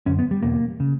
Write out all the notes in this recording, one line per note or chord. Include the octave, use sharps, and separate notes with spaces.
F#2 D3 C#4
B3
G3
E2 B2 A#3
C#3